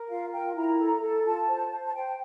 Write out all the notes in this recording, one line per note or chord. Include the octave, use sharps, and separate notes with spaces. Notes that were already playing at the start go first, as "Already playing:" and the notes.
Already playing: A#4
F4 F5
A#4 G5
E4 A#5
A4
A4
F4 A5
C5
C5
A5
C5 G5